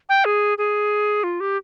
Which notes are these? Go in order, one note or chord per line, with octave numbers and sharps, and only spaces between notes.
G5
G#4
G#4
F4
G4